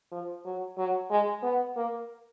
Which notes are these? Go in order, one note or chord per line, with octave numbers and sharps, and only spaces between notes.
F3
F#3
F#3
G#3
B3
A#3